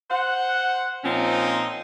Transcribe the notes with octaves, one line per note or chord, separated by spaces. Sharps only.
C5 F#5
A#2 F3 C4 C#4 D#4